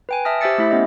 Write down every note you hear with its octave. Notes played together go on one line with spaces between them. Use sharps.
B4 G5 G#5
E5 A5 D#6 F6 A#6
G4 C5 E5 E6 A6 C#7
A3 E4 E5
B3 C#4 G4 D#5